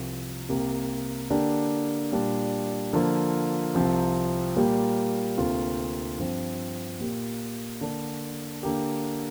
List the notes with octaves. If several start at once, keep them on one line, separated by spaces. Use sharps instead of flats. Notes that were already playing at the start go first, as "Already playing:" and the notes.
Already playing: C2 C3 F3
C2 C3 A#3 G4
D3 A#3 D4 G4
A#2 G3 D4
D3 F3 A#3 F4
C2 C3 F3 C4
A#2 G3 A#3 G4
D2 C3 A#3 F4
G2 F3 C4
A#2 A#3 G4
D3 A#3 D4
D3 A#3 G4